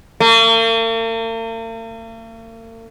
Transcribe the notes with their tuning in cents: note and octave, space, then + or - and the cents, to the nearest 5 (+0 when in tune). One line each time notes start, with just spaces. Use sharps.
A#3 -45